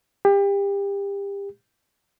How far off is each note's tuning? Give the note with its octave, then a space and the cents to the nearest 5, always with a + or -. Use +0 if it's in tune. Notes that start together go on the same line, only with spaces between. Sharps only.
G4 +30